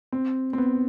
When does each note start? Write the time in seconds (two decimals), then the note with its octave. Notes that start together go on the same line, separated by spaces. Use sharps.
0.12 C4
0.53 C4
0.58 B3